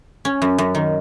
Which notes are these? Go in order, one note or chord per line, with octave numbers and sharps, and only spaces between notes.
C#4
F#2
F#2
D#3